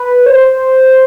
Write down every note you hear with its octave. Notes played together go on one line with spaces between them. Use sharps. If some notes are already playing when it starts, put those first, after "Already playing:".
Already playing: B4
C#5
C5